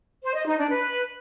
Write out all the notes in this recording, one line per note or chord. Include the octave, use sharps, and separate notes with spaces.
C5
D#5
D#4
D4
B4